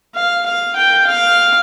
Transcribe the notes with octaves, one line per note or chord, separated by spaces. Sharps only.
F5
F5
G5
F5